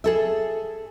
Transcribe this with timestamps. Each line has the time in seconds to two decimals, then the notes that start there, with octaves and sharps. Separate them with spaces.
0.04 G#4 A4 E5